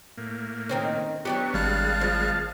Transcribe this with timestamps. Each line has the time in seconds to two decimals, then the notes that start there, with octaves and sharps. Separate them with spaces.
0.18 A2 A#3
0.69 D#3 C4 C#4
1.25 F#3 B3 D4 G4 C#6
1.54 G#1 G3 G#3 F5 A5 F#6
2.01 F3